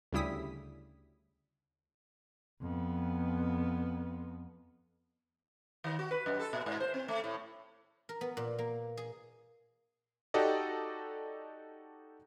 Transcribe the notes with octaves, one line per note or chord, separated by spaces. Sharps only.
D2 C#3 G3 E4 D#6 B6
F2 B3
D#3
F#4
B4
F#2
A4
A#2
G#2
C5
C4
A3
A2
A#4
B3
A#2
A#3
G#4
D#4 F#4 G4 A4 D5 D#5